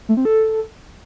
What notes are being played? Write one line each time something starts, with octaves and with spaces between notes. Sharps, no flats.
A3
C4
A4